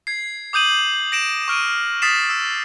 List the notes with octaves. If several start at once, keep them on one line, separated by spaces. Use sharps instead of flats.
G#6 C7
D6 D#6 G6 D#7 F#7
A#6 D7 E7
C#6 F6 D7 D#7
D#6 A6 B6 C7 E7
E6